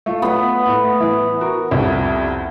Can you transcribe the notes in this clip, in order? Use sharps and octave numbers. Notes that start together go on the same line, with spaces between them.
A3 F4
B3 F#5
A2
E3
F#4 A#4
C2 F2